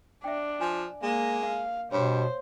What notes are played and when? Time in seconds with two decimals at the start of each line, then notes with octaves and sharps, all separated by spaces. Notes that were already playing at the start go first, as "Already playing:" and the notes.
0.24 D4 E5 G5
0.61 F3 G#5
1.03 G#3 A#3
1.46 F5
1.92 G2 B2 C5 C#5